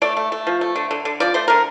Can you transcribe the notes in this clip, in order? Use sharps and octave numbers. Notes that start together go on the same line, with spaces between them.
A3 D5
A3
A3
F3
A3
D3
D3
D3
F3 D5
A3 C5
D3 A#4